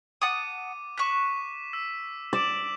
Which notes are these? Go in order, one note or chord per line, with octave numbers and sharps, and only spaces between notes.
F#5 A5 D6 D#6 D#7
C#6 F#6 B6 E7
E6 B6
D5 D7 E7 F#7